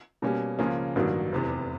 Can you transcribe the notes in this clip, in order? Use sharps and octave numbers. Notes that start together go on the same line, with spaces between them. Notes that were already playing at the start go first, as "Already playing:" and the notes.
B2 G3 A#3 C#4
C#2 C#3 F3 A#3 C#4
A1 G2 D#3 F#3 A#3
F1 E2 C3